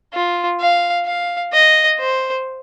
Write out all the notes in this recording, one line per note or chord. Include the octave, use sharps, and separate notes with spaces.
F4
F5
F5
D#5
C5